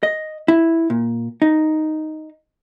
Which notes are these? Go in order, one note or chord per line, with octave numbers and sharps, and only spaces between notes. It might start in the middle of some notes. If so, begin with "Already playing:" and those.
D#5
E4
A#2
D#4